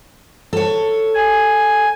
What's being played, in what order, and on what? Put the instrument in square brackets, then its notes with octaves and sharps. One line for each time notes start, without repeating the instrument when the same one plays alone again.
[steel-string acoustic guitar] A4 C#5
[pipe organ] G#5